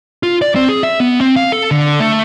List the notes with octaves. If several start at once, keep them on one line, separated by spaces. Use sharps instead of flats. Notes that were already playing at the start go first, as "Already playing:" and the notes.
F4
D5
C4
G#4
E5
B3
C4
F5
A4
D3
A3